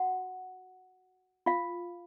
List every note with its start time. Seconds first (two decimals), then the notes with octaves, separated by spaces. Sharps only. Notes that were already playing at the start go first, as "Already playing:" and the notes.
Already playing: F#4 F#5
1.46 F4 F5